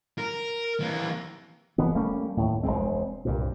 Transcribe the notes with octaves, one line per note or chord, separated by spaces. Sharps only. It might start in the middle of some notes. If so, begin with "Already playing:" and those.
A#4
E3 A#3
F1 E3 B3
G3 A3 A#3 C#4
D#2 A2
E1 E2 G#3 C4
C2 G2 A#2